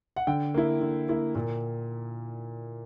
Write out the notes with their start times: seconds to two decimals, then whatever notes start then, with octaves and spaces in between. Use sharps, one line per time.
0.16 F#5
0.27 D3 G5
0.54 A#3 E4
0.81 D3
1.09 A#3 E4
1.35 A#2